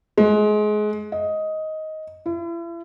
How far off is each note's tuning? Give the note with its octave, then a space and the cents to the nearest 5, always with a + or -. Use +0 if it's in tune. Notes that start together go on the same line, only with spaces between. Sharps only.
G#3 +25
D#5 +10
E4 +40